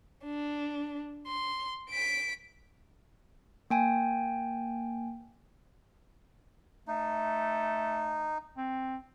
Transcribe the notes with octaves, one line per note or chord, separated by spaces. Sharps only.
D4
C6
B6 D7
A#3 G5 G#5
A3 D#4
C4